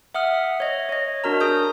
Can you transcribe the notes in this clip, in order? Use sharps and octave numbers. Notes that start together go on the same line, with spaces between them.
E5 F#5 D#6 F6
C#5 D#5
C#5 D#5
D4 F#4 A#4 A#5
G#4 D#6 G6